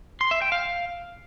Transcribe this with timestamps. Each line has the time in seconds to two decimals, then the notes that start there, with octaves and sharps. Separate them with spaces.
0.21 C6
0.31 E5
0.42 G5
0.52 F5